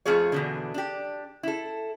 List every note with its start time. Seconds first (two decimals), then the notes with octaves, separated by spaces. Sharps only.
0.05 F2 A3 F4 G#4 C#5
0.32 E2 B2 D3
0.74 D4 G4
1.43 E4 A4